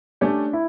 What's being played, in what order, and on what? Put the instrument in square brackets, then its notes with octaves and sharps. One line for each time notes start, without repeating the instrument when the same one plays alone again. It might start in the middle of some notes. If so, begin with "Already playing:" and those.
[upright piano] A3 C#4 G4 C#5 [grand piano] D4
[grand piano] E4